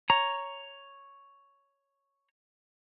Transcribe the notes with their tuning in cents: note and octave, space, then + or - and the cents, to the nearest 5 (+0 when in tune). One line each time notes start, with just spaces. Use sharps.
C#5 +0 A#5 +0